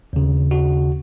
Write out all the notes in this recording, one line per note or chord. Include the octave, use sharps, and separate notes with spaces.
D#2 C#3
F#4